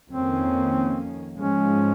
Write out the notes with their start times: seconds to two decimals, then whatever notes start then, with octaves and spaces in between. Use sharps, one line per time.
0.11 F2 D#3 A#3 C4 C#4
1.37 G#2 F3 G#3 C#4